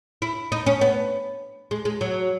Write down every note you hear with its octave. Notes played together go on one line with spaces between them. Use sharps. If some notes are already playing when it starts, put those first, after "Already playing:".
E4
D#4
C#4
B3
G#3
G#3
F#3